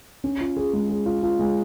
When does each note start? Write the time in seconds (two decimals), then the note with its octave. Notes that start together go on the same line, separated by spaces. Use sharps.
0.24 C#4
0.41 F4
0.57 G#4
0.73 G#3
0.90 G#4
1.06 F4
1.23 F4
1.39 G#3